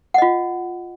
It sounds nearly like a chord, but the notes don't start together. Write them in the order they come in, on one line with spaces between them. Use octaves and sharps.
F#5 D#5 F4